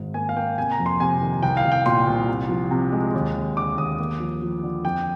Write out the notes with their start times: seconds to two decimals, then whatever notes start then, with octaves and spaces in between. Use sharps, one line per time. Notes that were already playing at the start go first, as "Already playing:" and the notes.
Already playing: G#1 G#2
0.14 A#3 G#5
0.29 F5
0.37 A#3 G5
0.58 C3 G#5
0.72 A#5
0.80 F2
0.86 C6
1.00 C3 G#5
1.22 D#3
1.42 C2 G5
1.57 F5
1.65 C2
1.72 G5
1.86 A#2 C6
2.07 C2
2.28 C3
2.49 F3
2.71 C3
2.92 G#3
3.14 D#2
3.35 D#2
3.57 D3 D6
3.77 D#2 D#6
3.99 A#3
4.20 F3
4.42 F3
4.63 D3
4.84 F2 G5